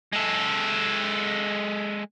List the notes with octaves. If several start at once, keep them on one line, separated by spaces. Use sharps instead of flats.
G#3 A4